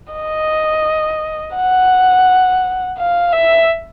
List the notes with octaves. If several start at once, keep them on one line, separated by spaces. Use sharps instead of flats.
D#5
F#5
F5
E5